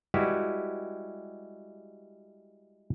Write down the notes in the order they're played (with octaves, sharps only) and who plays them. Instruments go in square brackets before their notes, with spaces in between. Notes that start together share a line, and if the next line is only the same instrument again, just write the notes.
[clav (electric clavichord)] G3 G#3 E4 F#4 G4 B4